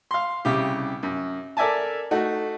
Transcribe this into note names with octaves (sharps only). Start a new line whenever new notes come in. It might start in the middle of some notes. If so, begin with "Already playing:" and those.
F5 C6
C2 C#3 G4
F#2
A4 A#4 D5 E5 G#5 A5
A3 D#4 F#4